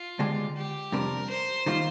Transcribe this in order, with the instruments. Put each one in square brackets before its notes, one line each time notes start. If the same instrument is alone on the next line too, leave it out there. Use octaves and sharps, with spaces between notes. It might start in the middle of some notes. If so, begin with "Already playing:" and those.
Already playing: [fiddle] F4
[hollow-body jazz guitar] D2 D3 G#3 D4 G4
[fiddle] G4
[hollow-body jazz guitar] F2 C3 G3 D4 [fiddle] A#4
[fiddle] C5
[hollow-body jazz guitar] D#3 G3 A#3 F4